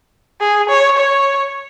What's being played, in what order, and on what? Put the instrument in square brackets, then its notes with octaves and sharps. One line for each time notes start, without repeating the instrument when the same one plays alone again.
[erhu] G#4
C#5
C#5